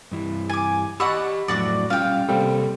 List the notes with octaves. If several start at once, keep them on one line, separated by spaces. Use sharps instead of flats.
G2 E3
G#5 D6
F#4 G4 D5 D#5 F#5 B5 C#6 E6
F2 A2 F#3 D4 F#4 D5
G3 C#4 F4 F5 G5
C3 G3 A#3 C4 A4